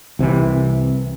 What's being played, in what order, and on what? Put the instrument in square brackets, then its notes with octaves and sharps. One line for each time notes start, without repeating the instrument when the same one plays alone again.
[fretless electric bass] C2 C3 D#3 E3